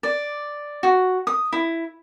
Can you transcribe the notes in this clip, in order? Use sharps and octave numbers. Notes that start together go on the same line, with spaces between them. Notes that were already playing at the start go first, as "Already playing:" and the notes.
D5
F#4
D#6
E4